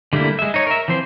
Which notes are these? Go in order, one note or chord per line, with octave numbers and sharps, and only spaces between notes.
D3 G3 A3 A#3 E4
G#3 E5
D#4 C#5
A#4 E5
E3 F3 C4 C5